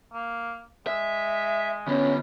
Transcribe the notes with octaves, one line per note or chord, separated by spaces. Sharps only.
A#3
G#3 E5
D3 B3 C#4